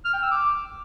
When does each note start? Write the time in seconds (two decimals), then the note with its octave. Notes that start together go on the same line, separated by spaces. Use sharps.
0.05 F6
0.14 G5
0.22 E6
0.31 D6